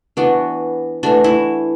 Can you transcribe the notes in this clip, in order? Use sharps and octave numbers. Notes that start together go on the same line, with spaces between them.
E3 B3 D4 F#4
E3 A3 D4 F#4
E4